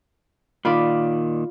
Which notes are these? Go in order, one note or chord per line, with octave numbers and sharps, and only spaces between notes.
A#2 D#3 F4 D5 B5